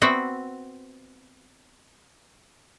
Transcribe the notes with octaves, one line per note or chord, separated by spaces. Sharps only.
B3 C4 F#4 E5